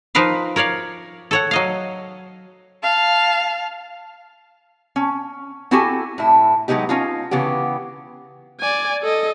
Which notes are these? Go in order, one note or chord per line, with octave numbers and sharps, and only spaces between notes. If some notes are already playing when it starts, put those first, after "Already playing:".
F3 D#4 A#4 B4 F5
A#4 C#5 D5 F5
A4 C#5 F#5
F#3 D#5 F5
F5 A5
C#4
C4 E4 F#4 G4 A4 G#5
A2 E4
F#3 G#3 A3 B3 D#4 G4
C#4 D#4 F4
C#3 E3 B3 G4
D5 G#5
A4 D#5